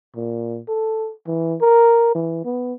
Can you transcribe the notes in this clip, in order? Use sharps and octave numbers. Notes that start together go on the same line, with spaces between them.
A#2
A4
E3
A#4
E3
B3